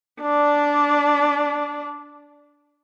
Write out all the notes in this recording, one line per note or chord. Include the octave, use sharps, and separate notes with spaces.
D4 D5